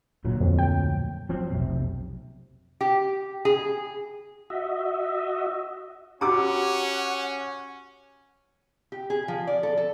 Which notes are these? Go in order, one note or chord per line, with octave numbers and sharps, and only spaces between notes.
D2 A#2 F#3
F2
G5
F3 F#3 C4
F1 B1 C3
G4
G#4
F#4 D#5 E5
C#4 F#4 G4 F#5 A#5 D6
G4
G#4
F3
D5
A4
A4